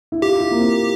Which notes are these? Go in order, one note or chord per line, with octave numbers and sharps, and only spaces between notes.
E4
F4 G4
E4
A#3
C4